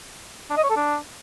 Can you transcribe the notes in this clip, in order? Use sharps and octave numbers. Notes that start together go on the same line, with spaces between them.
D4
D#5
C#5
A4
D4